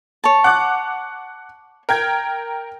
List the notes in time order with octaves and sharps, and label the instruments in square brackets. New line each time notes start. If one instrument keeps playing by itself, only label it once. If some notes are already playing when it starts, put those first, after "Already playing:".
[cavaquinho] C#5 A5
[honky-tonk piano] F#5 D6 F#6
A#4 G5 G#6